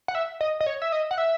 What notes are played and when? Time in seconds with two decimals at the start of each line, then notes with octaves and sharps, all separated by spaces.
0.08 F#5
0.15 E5
0.41 D#5
0.60 D#5
0.66 C#5
0.82 E5
0.92 D#5
1.11 F#5
1.18 E5